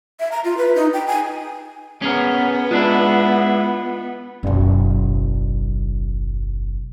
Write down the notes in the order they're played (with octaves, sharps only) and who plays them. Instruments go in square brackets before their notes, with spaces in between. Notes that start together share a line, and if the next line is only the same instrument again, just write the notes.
[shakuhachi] E5
A#5
F4
B4
D#4
G5
G#5
[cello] B3 [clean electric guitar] C#4 G#4 A#4
[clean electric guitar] G#3 D4 E4 [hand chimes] F4 F#6
[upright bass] F#1 B1